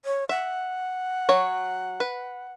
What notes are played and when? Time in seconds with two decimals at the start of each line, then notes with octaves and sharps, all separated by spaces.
0.05 C#5
0.29 E5 F#5
1.29 F#3 C#5
2.00 B4